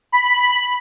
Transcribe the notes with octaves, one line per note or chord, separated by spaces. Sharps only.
B5